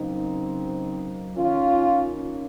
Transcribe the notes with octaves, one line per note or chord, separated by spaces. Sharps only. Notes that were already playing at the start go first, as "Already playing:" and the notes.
Already playing: C#3 F#3 A#3 C4 D#4
D#3 A#3 C#4 F4
C#4 F4